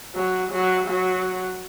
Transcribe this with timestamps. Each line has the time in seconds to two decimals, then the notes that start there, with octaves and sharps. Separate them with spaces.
0.15 F#3
0.51 F#3
0.87 F#3